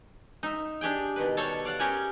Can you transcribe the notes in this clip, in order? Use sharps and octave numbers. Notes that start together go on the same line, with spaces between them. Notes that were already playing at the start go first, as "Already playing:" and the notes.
D#4 E5
D4 G4 G#4 G5
B2 D#3 B4
G3 A4 C#5 F5 A5
D5 F5 F#5 A5
C#4 G4 G#4 A#4 G#5